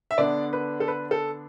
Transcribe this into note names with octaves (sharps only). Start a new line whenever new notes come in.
E5
D3 B3 D4 D5
B4
A4
B4
A4